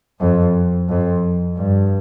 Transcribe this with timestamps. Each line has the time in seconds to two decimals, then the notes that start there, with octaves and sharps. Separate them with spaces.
0.20 F2
0.88 F2
1.57 G2